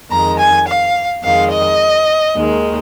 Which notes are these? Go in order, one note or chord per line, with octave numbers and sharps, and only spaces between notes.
F2 D#3 G#3 A#5
G#5
F5
F2 D#3 G#3 F5
D#5
D#2 D#3 G#3